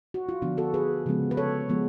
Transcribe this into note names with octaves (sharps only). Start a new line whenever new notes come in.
F#4
F4
D3 F3 B3 D4
F#4 A4
G#4 B4
C#3 F3 G#3 B3
B4
A4 C#5
F3 G#3 B3